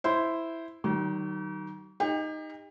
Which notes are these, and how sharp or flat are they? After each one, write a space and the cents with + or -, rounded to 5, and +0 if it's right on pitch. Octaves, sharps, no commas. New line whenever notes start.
E4 +0 C5 -10
D#3 -10 F#3 +45
D#4 +0 G4 +35